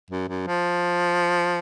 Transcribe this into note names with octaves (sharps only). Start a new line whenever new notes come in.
F#2
F#2
F3